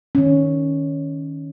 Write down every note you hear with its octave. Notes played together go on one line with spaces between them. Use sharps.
D#3 C#4